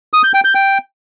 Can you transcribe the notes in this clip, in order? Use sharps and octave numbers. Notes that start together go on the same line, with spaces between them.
D#6
G6
G5
G6
G5